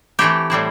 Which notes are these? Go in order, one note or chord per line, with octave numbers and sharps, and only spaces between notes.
E3 A3 C4 E4 G4
A2 G3 C4 E4